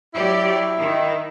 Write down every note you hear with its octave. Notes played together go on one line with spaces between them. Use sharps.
F#3 E4 G4 D5
D#3